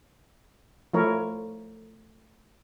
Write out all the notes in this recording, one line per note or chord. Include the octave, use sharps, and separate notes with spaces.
F3 A3 E4 A#4 C#5